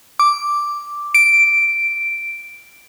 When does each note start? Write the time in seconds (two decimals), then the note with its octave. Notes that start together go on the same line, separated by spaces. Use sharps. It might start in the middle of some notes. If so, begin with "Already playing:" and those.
0.19 D6
1.14 D7